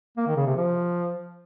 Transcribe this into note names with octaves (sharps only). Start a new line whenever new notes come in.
A#3
D#3
C#3
C3
F3